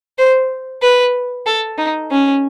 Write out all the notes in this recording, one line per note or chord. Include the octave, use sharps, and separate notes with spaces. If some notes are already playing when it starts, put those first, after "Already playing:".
C5
B4
A4
D#4
C#4